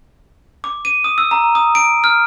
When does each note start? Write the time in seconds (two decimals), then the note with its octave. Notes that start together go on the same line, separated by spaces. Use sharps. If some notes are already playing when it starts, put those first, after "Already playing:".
0.64 D6
0.85 D#7
1.04 D#6
1.18 E6
1.31 A#5
1.55 D#6
1.75 D7
2.04 F6